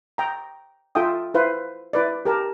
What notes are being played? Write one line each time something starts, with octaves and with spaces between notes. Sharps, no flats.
G5 A#5
F4 A4 E5 G5 D#6
E4 B4 C5 F5
E4 B4 D5
G4 A#4 A5